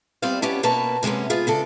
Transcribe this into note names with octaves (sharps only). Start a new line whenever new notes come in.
G3 B3 C4 C5 D5 F5
B3 C#4 D4 G4 C#5
B2 A#3 B4 C#5 A5
C3 G#3 A#3 B3 C#4
B3 F4 G#4
C#3 D4 A4